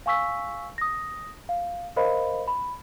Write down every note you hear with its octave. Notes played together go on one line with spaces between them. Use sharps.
F5 G#5 C#6 E6 B6
D#6 A#6
F5
A#4 C5 D#5 F5 B5
B5